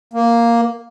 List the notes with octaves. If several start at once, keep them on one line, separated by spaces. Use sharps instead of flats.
A#3